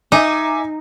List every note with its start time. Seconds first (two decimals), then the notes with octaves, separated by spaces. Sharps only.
0.12 D#4 E5 G#5 D6